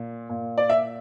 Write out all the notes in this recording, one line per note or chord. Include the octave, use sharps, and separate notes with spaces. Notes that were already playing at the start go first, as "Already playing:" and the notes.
Already playing: A#2
A#2
D5
E5